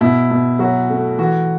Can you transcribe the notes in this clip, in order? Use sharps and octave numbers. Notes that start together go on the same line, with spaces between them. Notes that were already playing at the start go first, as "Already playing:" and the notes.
B2 E4
B2
F#3 F#4
A3
E3 F#4